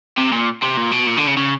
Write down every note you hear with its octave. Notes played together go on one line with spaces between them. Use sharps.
C3
A#2
C3
A#2
B2
A#2
D3
C#3
C#3